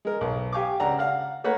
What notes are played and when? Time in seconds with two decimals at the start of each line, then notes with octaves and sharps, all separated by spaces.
0.05 G#3 A#4
0.21 B1
0.52 G4 F5 G#5 C#6 D6
0.80 C#2 D4 F#5 A#5
0.98 F5 F#5 F6
1.44 A3 A#3 B4 C#5 F#5